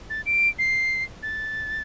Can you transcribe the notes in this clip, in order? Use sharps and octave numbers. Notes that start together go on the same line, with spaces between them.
A6
D7
C7
A6